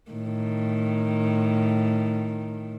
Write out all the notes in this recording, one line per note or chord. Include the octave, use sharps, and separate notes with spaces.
A2 D#3